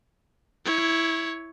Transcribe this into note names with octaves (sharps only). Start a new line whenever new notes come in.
E4 C#5